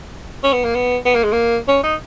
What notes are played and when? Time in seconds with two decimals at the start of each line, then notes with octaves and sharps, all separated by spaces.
0.44 C#4
0.53 B3
0.64 A#3
0.75 B3
1.05 B3
1.15 A#3
1.24 G#3
1.32 A#3
1.68 C#4
1.83 D#4